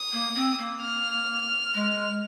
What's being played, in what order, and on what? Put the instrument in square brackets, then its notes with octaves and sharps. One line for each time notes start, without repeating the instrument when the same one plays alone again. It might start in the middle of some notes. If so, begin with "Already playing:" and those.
Already playing: [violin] D#6
[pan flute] A#3
C4
A#3
[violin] F6
[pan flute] G#3